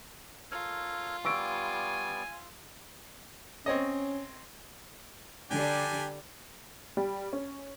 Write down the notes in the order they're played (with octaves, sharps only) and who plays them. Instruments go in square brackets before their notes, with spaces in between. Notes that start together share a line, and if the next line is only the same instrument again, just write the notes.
[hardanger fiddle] F4 [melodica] A4 A#4 C#5
[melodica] G3 B3 D5 [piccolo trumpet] G#5 [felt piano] C#6 E6 D7
[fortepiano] C4 C#5 D#5 [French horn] C#4
[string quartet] D3 G3 [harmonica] D4 G4 G#5
[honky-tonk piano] G3
C#4